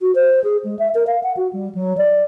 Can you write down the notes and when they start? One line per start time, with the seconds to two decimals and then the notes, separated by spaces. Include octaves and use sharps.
0.01 F#4
0.15 C5
0.44 G#4
0.64 G#3
0.79 E5
0.95 A#4
1.07 F5
1.23 F#5
1.37 F#4
1.53 G3
1.75 F#3
1.97 D5